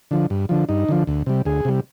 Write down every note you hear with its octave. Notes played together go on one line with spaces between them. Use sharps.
D3 F3
G2
D3 F3
G2 D#4
D3 F3
D2
C3 G3
D2 G#4
C3 G3